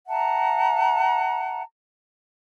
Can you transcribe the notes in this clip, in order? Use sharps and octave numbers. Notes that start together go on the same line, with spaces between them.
E5 F#5 A5 A#5